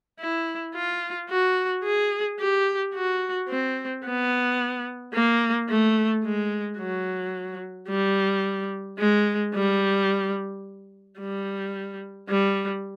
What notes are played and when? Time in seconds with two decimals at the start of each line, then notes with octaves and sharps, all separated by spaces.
0.20 E4
0.75 F4
1.29 F#4
1.84 G#4
2.39 G4
2.94 F#4
3.49 C4
4.05 B3
5.14 A#3
5.69 A3
6.24 G#3
6.79 F#3
7.88 G3
8.99 G#3
9.54 G3
11.19 G3
12.29 G3